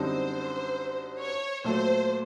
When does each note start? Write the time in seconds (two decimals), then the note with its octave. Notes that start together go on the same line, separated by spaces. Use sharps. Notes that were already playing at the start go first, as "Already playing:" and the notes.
Already playing: F#2 D3 G3 C4 D#4 C5
1.20 C#5
1.64 A#2 F#3 A3 C5